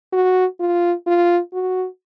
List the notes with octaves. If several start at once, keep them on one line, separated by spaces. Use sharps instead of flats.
F#4
F4
F4
F#4